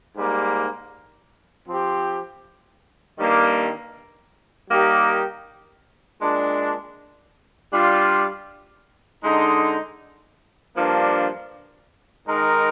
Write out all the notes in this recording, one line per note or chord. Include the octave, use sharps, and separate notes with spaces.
G#2 G3 A#3
F3 C4 G4
G2 D#3 G3 A#3
G3 A#3 D#4 G4 A#4
A#2 G#3 D4
G3 D4 F4
D3 G#3 D#4
G2 F3 A#3 D4
D#3 G#3 D#4 A#4